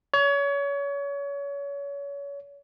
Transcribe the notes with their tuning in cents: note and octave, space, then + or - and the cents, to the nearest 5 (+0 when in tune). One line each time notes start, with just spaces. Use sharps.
C#5 +30